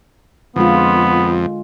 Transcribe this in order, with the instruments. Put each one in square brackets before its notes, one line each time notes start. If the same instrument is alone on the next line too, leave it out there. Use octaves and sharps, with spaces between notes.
[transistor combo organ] F2 [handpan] D3 G#3 F4 [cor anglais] B3